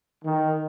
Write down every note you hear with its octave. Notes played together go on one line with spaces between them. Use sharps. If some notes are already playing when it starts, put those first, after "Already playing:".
D#3